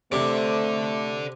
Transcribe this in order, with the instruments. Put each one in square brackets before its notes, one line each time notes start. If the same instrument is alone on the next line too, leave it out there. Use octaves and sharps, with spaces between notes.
[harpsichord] C3 [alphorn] A3 [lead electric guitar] A4 D5